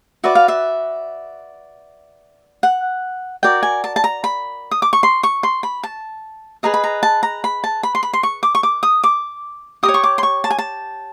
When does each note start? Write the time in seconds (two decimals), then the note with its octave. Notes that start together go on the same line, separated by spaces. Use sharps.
0.24 F#4 B4 D5 E5
0.35 F5
0.48 E5
2.63 F#5
3.43 F#4 A#4 D5 G5
3.63 G#5
3.84 A5
3.96 A5
4.04 A#5
4.24 B5
4.71 D#6
4.82 D6
4.93 C#6
5.03 C6
5.23 C#6
5.43 C6
5.63 B5
5.83 A5
6.63 G#4 B4 D#5 A#5
6.74 B5
6.84 A#5
7.03 A5
7.23 A#5
7.44 B5
7.64 A5
7.83 B5
7.95 C6
8.03 B5
8.13 C6
8.23 C#6
8.43 D6
8.55 C#6
8.63 D6
8.83 D#6
9.04 D6
9.83 G4 A#4 D#6
9.88 C#5
9.94 C#6
10.04 D6
10.18 C6
10.23 C#6
10.44 A5
10.50 G#5
10.58 A5